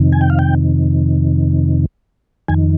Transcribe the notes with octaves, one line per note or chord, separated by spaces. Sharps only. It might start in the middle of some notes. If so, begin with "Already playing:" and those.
Already playing: F2 C3 D#3
G#5
G5
F5
G5
F2 D#3 G#5